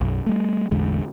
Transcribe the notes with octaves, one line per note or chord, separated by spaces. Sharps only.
B1 F#2
G3 A3
A1 E2 D3 G#3